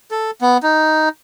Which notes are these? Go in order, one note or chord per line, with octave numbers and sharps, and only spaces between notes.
A4
B3
D#4